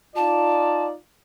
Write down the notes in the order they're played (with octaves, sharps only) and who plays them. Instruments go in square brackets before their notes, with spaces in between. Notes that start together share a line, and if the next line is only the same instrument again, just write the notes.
[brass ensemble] D#4 F4 D5 [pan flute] A5